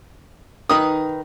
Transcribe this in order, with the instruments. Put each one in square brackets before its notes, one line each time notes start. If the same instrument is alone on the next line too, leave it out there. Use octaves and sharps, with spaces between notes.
[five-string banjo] D#3 D#4 B4 [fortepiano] D#6